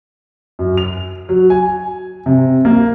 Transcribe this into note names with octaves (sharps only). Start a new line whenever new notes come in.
F#2
F7
F#3
G#5
C3
A#3